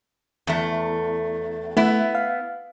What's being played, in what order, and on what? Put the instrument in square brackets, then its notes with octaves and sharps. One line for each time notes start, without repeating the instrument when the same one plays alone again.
[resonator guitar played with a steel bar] E2 A3
[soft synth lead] A3 [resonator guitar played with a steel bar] B3 E4
[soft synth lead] F5